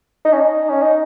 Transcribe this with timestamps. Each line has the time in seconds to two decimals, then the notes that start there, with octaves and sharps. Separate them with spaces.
0.25 D#4
0.33 C#4
0.40 D#4
0.69 C#4
0.82 D#4